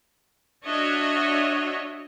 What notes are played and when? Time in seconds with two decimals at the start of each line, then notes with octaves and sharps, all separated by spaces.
0.65 D4 F#4 C#5 D#5 E5